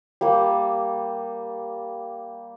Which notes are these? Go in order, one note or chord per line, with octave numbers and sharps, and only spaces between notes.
G3 A#3